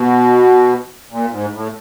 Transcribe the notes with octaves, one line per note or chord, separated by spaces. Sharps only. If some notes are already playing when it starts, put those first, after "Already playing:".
Already playing: B2
A#2
G#2
A2